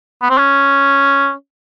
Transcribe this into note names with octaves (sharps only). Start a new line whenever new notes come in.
B3
C4
C#4